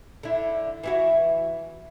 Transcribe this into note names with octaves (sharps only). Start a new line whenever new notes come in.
D3 E4
E3 E4 F#4